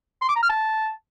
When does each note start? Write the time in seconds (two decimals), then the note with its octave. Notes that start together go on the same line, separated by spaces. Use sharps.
0.22 C6
0.29 D6
0.36 A#5
0.42 F6
0.49 A5